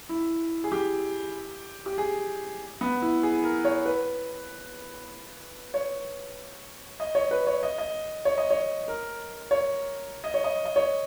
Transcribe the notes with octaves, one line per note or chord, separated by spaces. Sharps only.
E4
G#4
G4
G4
G#4
B3
E4
G#4
A#4
C#5
B4
C#5
D#5
C#5
B4
C#5
D#5
D#5
C#5
D#5
C#5
A#4
C#5
D#5
C#5
D#5
D#5
C#5